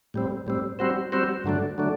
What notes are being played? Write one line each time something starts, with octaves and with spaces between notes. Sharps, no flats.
A2 G3 C4
A2 G3 C4
G3 C4 F#4 C5
G3 C4 F#4 C5
G2 D3 F#3 A3 D4
D3 F#3 A3 D4